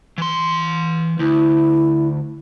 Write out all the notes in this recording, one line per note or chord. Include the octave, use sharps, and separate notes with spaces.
E3 C6
D2 E4